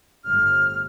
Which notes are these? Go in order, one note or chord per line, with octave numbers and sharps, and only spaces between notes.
G1 A2 F6